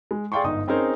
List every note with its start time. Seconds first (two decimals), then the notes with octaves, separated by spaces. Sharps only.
0.11 G#3
0.32 G#4 D5 F5 G5 C6 C#6
0.44 G1 G#2 D#4 D#6
0.67 C4 C#4 D#4 G#4 A#4 C5